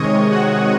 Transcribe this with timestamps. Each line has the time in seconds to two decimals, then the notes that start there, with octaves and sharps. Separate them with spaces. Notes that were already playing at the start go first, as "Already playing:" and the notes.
Already playing: C3 D#3 G#3 C#5 D#5 C#6 D#6
0.31 F#4 F#5